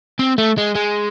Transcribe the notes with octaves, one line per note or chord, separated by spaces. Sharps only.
C4
A3
G#3
G#3